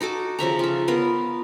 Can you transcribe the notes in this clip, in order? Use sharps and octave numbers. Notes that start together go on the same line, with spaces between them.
D#4 F#4 A4 D6
C#3 F3 E5 A#5
F4 E5
B3 F4 A#4